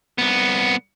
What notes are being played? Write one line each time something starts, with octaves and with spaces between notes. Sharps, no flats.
C2 B3